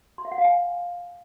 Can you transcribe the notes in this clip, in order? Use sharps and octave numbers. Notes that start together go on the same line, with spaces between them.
C6
E5
F#5
F5
G#5